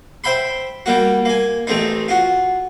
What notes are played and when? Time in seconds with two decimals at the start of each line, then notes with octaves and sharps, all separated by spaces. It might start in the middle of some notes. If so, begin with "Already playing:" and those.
0.24 C5 E5 G5 B5 C6
0.86 G3 A#3 F#4
1.25 A#3 G#5
1.67 A1 A3 C4 D#4
2.08 F4 F#4